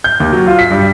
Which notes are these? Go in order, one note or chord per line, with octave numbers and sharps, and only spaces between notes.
G6
D#2
F#3
F4
B6
G2